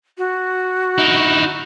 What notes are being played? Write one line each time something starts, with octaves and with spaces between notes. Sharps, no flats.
F#4
D#4 E4